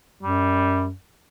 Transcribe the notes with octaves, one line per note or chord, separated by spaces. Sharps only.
F#2 G3